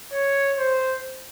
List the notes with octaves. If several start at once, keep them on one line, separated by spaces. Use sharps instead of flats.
C#5
C5